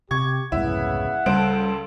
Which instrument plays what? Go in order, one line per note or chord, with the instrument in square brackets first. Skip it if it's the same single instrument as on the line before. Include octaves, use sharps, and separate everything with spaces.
[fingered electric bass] C3 [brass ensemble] G4 [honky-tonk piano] C#6 G#6
[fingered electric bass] C2 F2 G#2 [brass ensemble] C#3 B3 [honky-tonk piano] E4 [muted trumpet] F#5
[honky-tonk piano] C#2 C5 D7 [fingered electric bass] G3 [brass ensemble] A4